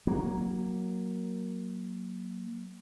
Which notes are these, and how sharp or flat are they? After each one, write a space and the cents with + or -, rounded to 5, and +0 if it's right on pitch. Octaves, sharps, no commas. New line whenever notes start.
F#3 +0 A#3 +5